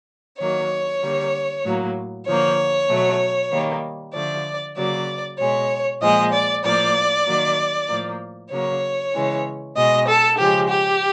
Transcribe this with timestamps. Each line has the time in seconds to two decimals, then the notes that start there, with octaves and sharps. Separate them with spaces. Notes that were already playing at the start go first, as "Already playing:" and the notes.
0.39 D#3 F#3 A#3 C#5
1.02 D3 G3 A#3
1.64 A2 F#3 A#3
2.26 D3 F3 A#3 C#5
2.89 B2 F#3 A3
3.52 D#3 G3 A#3
4.14 D3 F3 A3 D5
4.77 C#3 F#3 A#3 D5
5.39 B2 G#3 C#5
6.01 A#2 F3 G#3 D#5
6.32 D5
6.64 A2 F3 A#3 D5
7.27 D#3 F#3 A#3
7.89 A2 F3 A#3
8.51 C#3 F#3 A#3 C#5
9.14 C#3 E3 G#3
9.76 B2 G#3 D#5
10.08 A4
10.38 C#3 F3 G#3 G4
10.69 G4